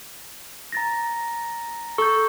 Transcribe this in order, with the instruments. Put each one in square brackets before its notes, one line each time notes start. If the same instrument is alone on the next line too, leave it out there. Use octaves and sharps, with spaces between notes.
[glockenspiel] A#5 A6 A#6
[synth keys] A4 [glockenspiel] C#6 G6